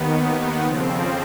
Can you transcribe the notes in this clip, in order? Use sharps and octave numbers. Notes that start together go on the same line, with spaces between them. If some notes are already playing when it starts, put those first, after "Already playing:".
Already playing: D#2 D#3 B3
F2 C#3 F3 C4